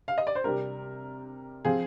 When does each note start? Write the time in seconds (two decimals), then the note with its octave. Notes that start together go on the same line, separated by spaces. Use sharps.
0.08 F5
0.18 D#5
0.27 D5
0.35 C5
0.44 C3 G3 D4 A#4
1.65 F3 C4 F4 G#4